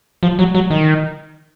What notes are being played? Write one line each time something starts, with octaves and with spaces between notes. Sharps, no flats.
F3
F#3
F#3
D#3